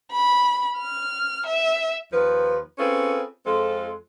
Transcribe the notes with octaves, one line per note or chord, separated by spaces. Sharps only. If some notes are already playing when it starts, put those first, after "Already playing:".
B5
F6
E5
D#2 F3 B4
C4 C#4 F4 G#4 A4 B4
F2 G#3 C4 F4 A4